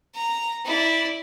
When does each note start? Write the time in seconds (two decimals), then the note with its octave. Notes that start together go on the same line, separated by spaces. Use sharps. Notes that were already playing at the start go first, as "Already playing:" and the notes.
0.15 A#5
0.65 E4 D5